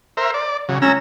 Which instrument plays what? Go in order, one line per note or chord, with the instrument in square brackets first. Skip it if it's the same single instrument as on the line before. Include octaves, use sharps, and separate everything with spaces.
[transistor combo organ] A#4 C5 E5
D5
C#3 F#3
[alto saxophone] C#4 [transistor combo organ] A#5 E6